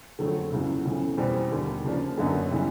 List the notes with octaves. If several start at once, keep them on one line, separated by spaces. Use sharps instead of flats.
F2 D3 F#3 A3
C#2 C#3 F#3 B3 E4
F2 C#3 E3 A3
E2 B2 G3 C4
D#2 D3 G3
C#3 F3 A#3 D4
F#2 D3 F#3 B3 D#4
C#3 E3 G3